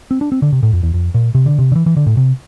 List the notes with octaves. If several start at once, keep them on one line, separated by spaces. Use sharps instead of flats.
C4
D4
C4
D3
C3
A2
F2
E2
F2
A#2
C3
D3
C3
D3
E3
E3
D3
A2
C3